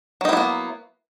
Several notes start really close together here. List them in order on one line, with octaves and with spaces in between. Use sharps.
F#3 D#4 E4 B3 A#3